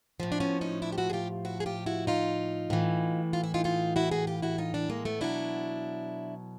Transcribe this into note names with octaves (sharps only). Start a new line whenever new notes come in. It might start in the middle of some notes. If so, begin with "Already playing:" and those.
A2 F3
D4
B3 C#4
C#4 D#4
D4 E4
G4
E4 F#4
G#4
F4 G4
E4 F#4
G#4
F4 G4
E4 F#4
D#4 F4
A2 E3
F4
E4
D#4 F4
D#4 F4
E4 F#4
F#4 G#4
F4 G4
E4 F#4
D#4 F4
D4 E4
G#3 A#3
A3 B3
B2 F#3 D4 E4